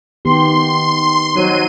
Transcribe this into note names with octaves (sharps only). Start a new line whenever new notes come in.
D#3 B3 G4 C6
F#3 D#4 C5 D#7